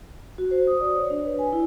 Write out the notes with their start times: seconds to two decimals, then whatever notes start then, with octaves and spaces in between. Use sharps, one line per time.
0.38 F#4
0.51 C5
0.67 D#6
0.80 D5
0.95 C#5
1.10 D4
1.26 B4
1.39 G#5
1.53 E4